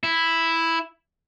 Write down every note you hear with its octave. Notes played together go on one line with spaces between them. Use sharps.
E4